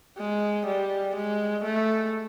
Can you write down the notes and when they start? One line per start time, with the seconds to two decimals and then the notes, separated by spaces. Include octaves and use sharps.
0.17 G#3
0.67 G3
1.16 G#3
1.64 A3